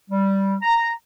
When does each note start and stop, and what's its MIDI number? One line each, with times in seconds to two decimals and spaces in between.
0.10 0.56 55
0.62 0.91 82